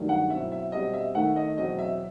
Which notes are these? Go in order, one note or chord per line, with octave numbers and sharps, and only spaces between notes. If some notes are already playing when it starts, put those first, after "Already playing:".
Already playing: G2 D#3 F#3 A3 D#4
F#5
B2 F#3 C4 E4 E5
E5
B2 G3 C4 D#5
E5
D#3 A3 D#4 F#5
D#5
E2 B2 F#3 C4 D#5
E5